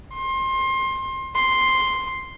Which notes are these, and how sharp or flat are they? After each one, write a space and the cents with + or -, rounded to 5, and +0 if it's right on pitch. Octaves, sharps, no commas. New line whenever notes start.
C6 +25
C6 +0